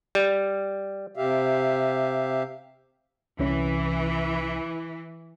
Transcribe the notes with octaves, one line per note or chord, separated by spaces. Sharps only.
G3
C3 G4 E5 F5
C2 E3 C#4